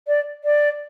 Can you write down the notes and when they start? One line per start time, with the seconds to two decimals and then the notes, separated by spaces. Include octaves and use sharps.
0.07 D5
0.44 D5